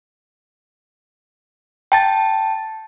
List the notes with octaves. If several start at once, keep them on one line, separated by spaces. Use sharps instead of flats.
G5 A5 A6